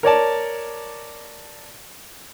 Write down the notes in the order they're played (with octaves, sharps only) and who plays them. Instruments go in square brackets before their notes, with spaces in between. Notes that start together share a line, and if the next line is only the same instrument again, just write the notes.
[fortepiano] A#4 C#5 D5 A5